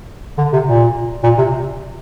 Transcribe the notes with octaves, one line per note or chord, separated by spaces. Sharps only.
D3
C3
A#2
A#2
C3